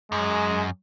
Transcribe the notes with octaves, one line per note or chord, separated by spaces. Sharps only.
F#2 G#3